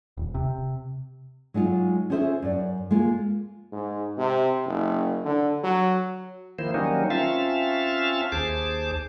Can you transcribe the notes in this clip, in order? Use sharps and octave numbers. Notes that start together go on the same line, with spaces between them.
D#1
C3
F#3 G#3 D#4 F4
C#4 F4 G#4 C5 D5 E5
F#2 D5
G#3 A#3 F4
G#2
C3
F#1
D3
F#3
D#3 F3 A#3 E4 C5
D#3 F#3 G3 A#3 C#4 D#4
C4 C#4 F4 E5 F5 A5
D#2 G#4 C5 A5 D6